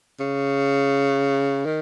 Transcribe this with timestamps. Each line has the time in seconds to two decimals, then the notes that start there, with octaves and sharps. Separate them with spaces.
0.20 C#3
1.65 D#3